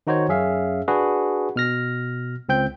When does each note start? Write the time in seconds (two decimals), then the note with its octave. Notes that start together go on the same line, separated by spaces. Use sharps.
0.07 D#3 D#4 F#4 C5 C#5
0.28 F#2 C#4 G#4 E5 F5
0.88 D4 F#4 G#4 B4
1.56 B2 F6 A#6
2.49 C#2 C4 G5 G6